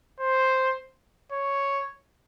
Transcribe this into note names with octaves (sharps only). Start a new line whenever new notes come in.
C5
C#5